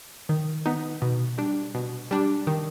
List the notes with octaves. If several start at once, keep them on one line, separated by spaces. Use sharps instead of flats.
D#3
B3 D#4
B2
G3 D4
B2
G3 D4
D#3